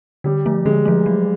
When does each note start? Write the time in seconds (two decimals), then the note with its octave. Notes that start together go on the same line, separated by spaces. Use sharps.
0.24 D3 G3
0.46 F3 A3
0.65 D3 G#3
0.85 F3 A3
1.06 F#3